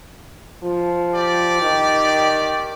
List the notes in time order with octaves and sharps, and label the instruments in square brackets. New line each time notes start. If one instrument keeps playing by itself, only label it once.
[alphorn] F3
[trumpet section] G4 D5
[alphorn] D#3